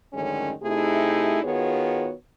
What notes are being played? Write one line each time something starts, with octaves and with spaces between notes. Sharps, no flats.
F#2 A2 D3 D#3 G#3 C#4
C3 A3 D#4 E4 G4 G#4
D#3 B3 F4 F#4 G#4 C#5